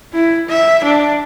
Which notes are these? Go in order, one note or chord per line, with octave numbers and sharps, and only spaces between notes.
E4
E5
D4